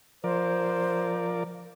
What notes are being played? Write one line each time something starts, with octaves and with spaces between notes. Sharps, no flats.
F3 A#4 C5 D5